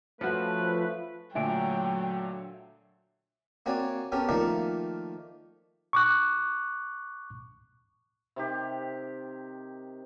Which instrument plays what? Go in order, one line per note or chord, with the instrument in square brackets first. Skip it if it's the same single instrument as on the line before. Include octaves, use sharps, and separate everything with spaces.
[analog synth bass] F3 [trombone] A3 [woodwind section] C#4 A4 B4 [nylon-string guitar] F#4 C5
[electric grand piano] A#2 D3 A3 [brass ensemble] F#3 [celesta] E5 G#5 D7 [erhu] G5
[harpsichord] A#3 C4 F#4 C#5 D5 G#5
B3 C#4 G4 A4 A#4
D#3 F3 A3 A#3 A#4 D5
[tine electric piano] C#6 D6 F#6
[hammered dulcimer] C3 D#3 G4